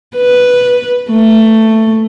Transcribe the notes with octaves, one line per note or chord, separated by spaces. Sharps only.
B4
A3